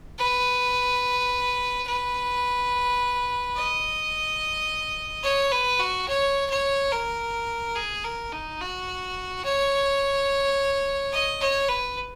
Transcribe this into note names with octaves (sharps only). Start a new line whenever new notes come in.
B4
B4
D#5
C#5
B4
F#4
C#5
C#5
A#4
G#4
A#4
D#4
F#4
C#5
D#5
C#5
B4